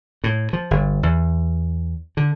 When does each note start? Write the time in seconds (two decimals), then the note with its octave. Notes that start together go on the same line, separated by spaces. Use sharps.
0.24 A2
0.53 F3
0.71 G1
1.03 E2
2.17 D3